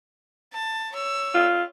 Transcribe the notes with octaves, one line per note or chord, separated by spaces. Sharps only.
A5
C#5 E6
F4